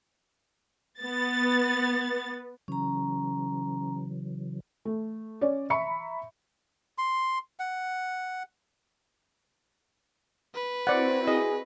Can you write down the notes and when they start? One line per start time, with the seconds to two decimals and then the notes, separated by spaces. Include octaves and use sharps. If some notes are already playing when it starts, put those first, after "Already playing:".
1.01 B3 A6
2.68 C#3 E3 F#3 C#4 A#5
4.85 A3
5.41 C#4 C#5 D5
5.70 E5 A#5 B5 C#6 C#7
6.98 C6
7.60 F#5
10.55 B4
10.87 C4 E4 F#4 C5 D5 F#5
11.27 G#4 D#5